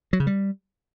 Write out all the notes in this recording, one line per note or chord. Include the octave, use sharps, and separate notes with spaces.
F#3
C#3
G3